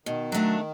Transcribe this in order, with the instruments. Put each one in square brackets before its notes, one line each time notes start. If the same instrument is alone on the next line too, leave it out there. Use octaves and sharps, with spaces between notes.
[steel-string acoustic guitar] B2 [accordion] D#3
[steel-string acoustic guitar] F#3 A3 D4